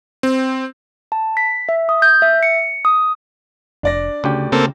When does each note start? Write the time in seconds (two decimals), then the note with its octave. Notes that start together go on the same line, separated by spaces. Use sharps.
0.23 C4
1.12 A5
1.37 B6
1.69 E5
1.89 D#6
2.02 G6
2.22 E5
2.43 C#7
2.85 D#6
3.83 F1 D4 D5 A#6
4.24 D2 C#3 G4
4.52 C#3 A#3 C4 A4